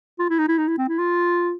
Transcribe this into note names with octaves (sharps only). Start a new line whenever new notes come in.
F4
E4
D#4
E4
D#4
E4
C4
E4
F4